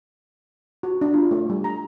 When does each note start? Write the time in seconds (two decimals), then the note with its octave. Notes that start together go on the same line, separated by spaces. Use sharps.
0.83 F#4
1.01 D4
1.14 F4
1.31 A3
1.50 G3
1.64 A#5